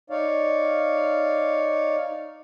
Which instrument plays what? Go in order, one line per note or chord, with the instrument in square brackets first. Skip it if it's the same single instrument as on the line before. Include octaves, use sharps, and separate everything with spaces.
[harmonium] D#4 C#5 D5 F5